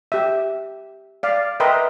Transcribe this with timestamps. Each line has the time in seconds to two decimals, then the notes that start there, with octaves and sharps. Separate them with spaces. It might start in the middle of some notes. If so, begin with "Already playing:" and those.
0.12 G4 E5
1.23 D5 F5
1.60 A#4 B4 D#5 E5 G5 C6